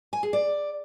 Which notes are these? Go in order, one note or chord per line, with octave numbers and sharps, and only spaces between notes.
G#5
G#4
D5